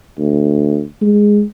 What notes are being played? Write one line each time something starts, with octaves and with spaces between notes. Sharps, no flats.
D2
G#3